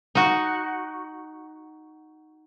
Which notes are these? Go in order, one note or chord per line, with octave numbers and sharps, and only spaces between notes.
D#4 F#4